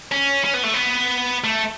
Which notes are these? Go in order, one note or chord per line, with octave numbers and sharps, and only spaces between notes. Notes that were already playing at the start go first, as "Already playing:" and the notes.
C#4
C#4
B3
A3
B3
A3